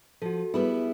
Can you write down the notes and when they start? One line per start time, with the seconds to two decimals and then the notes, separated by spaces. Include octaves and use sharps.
0.22 F3 F#4 A4
0.54 G3 B3 E4 G#4